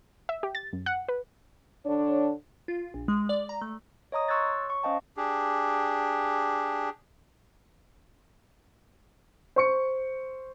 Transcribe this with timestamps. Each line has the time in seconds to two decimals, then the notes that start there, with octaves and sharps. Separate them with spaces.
0.29 E5
0.43 G4
0.55 A6
0.73 F#2
0.86 F#5
1.08 B4
1.86 D3 D4 C#5
2.68 F4
2.94 A#1
3.08 G#3
3.29 D5
3.49 A#5
3.61 A3
4.12 C#5 D#5 A#5 D#6
4.28 C6 C#6 E6 F#6 G#6 A6
4.48 C#5
4.70 C#6
4.83 C#4 C5 D#5 F5 G5 A5
5.17 D4 G4 G#4
9.56 C5 C#6 C#7